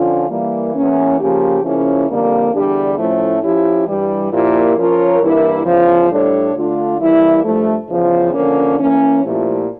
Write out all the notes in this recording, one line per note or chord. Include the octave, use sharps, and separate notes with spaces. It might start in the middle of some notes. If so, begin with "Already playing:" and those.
Already playing: D3 F3 C#4 F4
E3 G3 A#3
E2 E3 A#3 C#4
C#3 F3 A#3 C#4 G4
C#3 F3 A#3 C#4 E4
F2 D3 G3 A#3
E2 D3 G3 D4 G4
A2 F3 A3 C#4 E4
F3 C#4 E4 G4
G2 E3 G3
A#2 F3 A#3 E4 G4
F3 C#4 F4 A#4 C#5
G2 E3 A#3 E4 A#4
E2 C#3 F3
A2 G3 D4 A4 C#5
D3 A3 D4 F4
E3 G3 A#3 E4
G2 F3 A3
E2 C#3 F3
D3 F3 A#3 C#4
E3 A#3 C#4
A#2 F3 A3 E4 G4